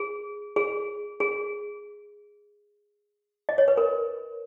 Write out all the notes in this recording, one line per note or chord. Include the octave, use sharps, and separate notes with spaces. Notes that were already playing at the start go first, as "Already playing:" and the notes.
Already playing: G#4
G#4
G#4
D#5
C#5
B4
A#4